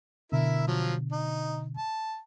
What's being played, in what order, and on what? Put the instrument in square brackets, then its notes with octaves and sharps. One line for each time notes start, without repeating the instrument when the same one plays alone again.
[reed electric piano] B2 D3 [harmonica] E4 A#4 E5
[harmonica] F3 F#3 F4
D#4
A5